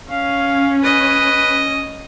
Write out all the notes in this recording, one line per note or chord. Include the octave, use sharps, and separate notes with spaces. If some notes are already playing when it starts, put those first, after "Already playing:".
C#4 F5
B4 D#5